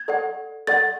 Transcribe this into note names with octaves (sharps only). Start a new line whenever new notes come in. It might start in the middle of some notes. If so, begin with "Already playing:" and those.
Already playing: G#6
A4 D5 F#5
A4 D5 F#5 A6